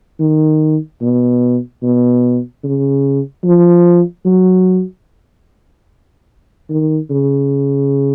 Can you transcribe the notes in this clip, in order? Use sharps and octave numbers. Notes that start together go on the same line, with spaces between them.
D#3
B2
B2
C#3
F3
F#3
D#3
C#3